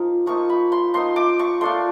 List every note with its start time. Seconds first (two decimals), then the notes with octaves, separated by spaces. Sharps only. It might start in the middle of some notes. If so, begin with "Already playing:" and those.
Already playing: F3 A#3 D#4
0.26 F3 A#3 D#4 C#6
0.49 B5
0.72 C6
0.94 F3 A#3 D#4 C6
1.16 D6
1.39 C#6
1.61 A3 D4 F4 C6